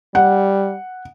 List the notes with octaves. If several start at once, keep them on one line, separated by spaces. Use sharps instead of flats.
G3 F#5